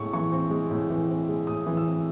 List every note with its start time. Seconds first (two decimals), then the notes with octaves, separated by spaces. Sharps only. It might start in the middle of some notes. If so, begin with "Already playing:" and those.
Already playing: A2 G#3 C#6
0.13 E3 C#6
0.32 C4
0.51 G#3
0.71 A2
0.90 E3
1.09 C4
1.29 G#3
1.47 A2 D#6
1.67 E3
1.77 E6
1.86 C4